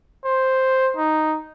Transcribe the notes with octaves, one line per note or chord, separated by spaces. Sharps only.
C5
D#4